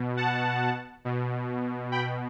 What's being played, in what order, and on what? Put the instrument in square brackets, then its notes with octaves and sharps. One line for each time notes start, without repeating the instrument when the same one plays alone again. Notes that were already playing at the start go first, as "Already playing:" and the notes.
Already playing: [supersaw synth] B2
F#5 A5
B2
G5 B5